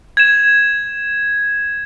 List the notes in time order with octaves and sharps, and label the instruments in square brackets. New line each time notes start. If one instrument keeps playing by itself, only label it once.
[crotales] G#6 E7